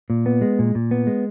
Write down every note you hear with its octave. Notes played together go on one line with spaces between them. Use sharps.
A#2
B3
G#3
A#2
A#2
B3
G#3